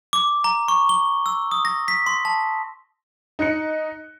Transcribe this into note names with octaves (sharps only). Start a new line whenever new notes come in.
D6
A#5
C#6
G7
E6
D#6
A#6
B6
C6
A5
D#4 F#6 C#7